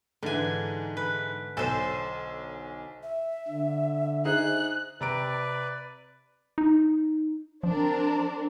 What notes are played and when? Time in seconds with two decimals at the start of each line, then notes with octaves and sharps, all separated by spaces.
0.23 G#2 D3 E3 G#5
0.97 B4
1.57 B1 A4 C5 G#5 E6
3.03 E5
3.49 D3
4.25 D#4 G#4 C5 F#6
5.01 C3 B4 D5 A#5 D7
6.58 D#4
7.63 F3 C4 D4 A#4